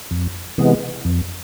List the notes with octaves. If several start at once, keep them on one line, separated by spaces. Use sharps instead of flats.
F2
C3 E3 G#3 B3
F2